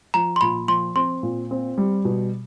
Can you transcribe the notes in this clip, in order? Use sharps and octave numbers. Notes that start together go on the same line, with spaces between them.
F3 A#5
C6
A#2 B5
F3 C6
C4 C6
A#2
C4
G3
B2